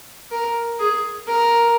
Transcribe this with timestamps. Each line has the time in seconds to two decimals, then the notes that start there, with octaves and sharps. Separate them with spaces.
0.31 A#4
0.79 G#4
1.27 A#4